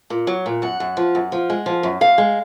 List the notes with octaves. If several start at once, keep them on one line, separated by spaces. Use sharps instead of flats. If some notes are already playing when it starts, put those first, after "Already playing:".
A#2
F#3
A#2
F#2 F#5
F#2
F3
F#2
F3
G#3
F3
F#2
F#2 F5
G#3